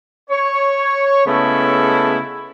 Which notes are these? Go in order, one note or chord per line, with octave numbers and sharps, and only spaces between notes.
C#5
C#3 G#3 A3 B3 E4 A4